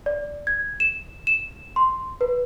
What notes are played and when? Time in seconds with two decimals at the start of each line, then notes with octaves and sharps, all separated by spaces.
0.06 D5
0.47 G#6
0.80 E7
1.27 E7
1.76 C6
2.21 B4